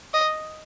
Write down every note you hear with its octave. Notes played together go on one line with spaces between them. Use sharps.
D#5